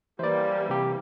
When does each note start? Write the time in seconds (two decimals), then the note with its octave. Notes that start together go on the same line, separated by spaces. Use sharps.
0.19 E3 G3 A#3 C5 D5
0.69 C3 G4